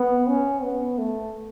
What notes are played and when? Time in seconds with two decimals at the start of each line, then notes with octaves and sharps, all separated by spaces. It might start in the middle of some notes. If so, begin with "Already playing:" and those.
Already playing: B3
0.28 C#4
0.63 B3
0.98 A3